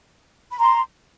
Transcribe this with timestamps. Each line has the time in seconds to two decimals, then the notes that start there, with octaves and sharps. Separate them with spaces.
0.52 B5
0.59 A#5 C6